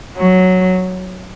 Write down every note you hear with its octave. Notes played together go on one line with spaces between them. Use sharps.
F#3